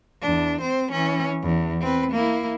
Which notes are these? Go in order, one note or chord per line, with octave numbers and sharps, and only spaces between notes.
E2 D4
C4 C5
E3 C#4
E2
C4 B4
A#3 E4